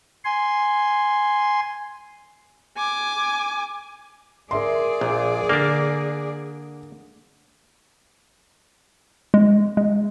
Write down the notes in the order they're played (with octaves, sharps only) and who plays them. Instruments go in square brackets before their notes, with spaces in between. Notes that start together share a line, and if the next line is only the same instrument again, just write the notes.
[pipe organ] G#5 C6
[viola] G#5 D6
[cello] G#4 D5 [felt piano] A#4 E5 C6
[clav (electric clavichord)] A#1 A#2
[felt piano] D3 [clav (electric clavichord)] A#3 D4
[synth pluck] G#3
G#3